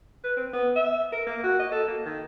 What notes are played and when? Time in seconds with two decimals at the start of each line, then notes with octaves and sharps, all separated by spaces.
0.24 B4
0.37 C4
0.53 B3
0.75 E5
1.12 A#4
1.26 A#3
1.44 F#4
1.59 D#5
1.72 A4
1.88 A#3
2.05 D#3